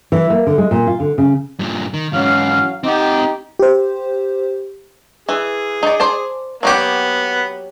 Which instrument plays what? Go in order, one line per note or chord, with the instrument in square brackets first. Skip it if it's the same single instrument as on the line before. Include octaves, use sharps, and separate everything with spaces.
[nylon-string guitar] E3
A#3
D3
G#3
A#2
F4
D3
C#3
[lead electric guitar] G2 A#2
D#3
[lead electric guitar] G#2 E3 [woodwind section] F#3 C#4 F5
[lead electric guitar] C4 F#5 [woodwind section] D#4 G4
[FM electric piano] G4 C5
[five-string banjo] E3 [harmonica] G#4
[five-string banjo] D#4 D5
C5 D5 A5
[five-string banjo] F#3 A#3 G4 [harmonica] B3